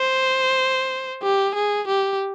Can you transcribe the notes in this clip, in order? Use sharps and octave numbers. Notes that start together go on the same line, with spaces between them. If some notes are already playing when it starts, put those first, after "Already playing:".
Already playing: C5
G4
G#4
G4